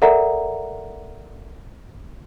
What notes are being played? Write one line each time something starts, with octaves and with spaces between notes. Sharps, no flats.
A4 A#4 D5 E5 F#5 A#5